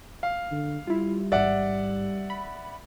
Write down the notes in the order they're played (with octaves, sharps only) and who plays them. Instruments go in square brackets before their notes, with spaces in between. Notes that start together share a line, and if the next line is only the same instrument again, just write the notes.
[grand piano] F5
[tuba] D3
[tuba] G3 [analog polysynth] E4 F4
[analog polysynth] A1 G#2 [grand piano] D5 E5 F#5
[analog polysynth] B5